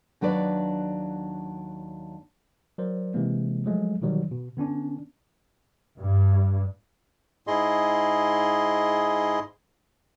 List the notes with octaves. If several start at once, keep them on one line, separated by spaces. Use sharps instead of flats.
D#2 F#3 D4 B4 D5
F#3 A#4 C5 D5
C3 E3 G#3 A#3
F3 F#3 G#3 A3
B2 D#3 E3 F#3 G3
B2
D3 B3 C#4 D4
G2
G#2 E4 G#4 D#5 C6